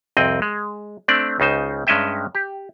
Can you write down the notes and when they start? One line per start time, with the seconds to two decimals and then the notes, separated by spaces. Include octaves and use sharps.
0.17 C2 F2 C4 D#5
0.42 G#3
1.08 A3 C4 D4 D5
1.40 C#2 C#3 D#4 C5
1.87 G2 G#3 C#4 D#5 E5 G5
2.35 G4